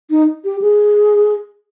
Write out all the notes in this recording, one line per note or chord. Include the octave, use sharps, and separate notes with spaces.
D#4
G4
G#4